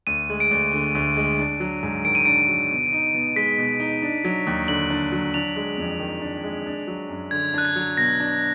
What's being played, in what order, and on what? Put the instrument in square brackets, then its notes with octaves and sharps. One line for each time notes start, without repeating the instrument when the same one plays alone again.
[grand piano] D2 [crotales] D#7
[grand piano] G#3
[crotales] D7
[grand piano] D2
D3
D2
G#3
D4
F#3
G#2
[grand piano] D#3 [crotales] D7
[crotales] D#7
[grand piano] D4 [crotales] D7
[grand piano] F#3
B2
D#4
B2
[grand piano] G#3 [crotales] B6
[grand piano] B2
D#4
D4
F#3
D#2
[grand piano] D3 [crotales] F#7
[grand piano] D4
F#3
[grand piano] D4 [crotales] F7
[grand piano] G#3
F2
D#3
D4
G#3
D4
F#3
F#2
[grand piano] D3 [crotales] G#6
[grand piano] D4 [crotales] F#6
[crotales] G#6
[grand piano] F#3
[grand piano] B2 [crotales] A#6
[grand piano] D4